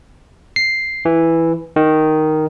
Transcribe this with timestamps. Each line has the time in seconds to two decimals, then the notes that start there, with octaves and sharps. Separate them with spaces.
0.56 C7
1.05 E3
1.76 D#3